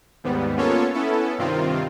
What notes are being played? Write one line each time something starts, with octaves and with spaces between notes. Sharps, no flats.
D#2 G#2 G3 B3
A#3 B3 C#4 F4 A4 C#5
B3 C#4 E4 A4
G2 C3 D#3 C4 F4